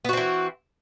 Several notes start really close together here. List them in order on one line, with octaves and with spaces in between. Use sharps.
B3 F#4 C4 E3